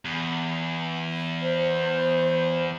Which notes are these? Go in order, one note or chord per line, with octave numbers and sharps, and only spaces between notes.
E2
C5